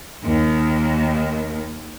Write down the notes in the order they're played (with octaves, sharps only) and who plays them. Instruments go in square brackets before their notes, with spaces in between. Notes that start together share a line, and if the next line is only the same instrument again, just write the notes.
[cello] D#2 D#3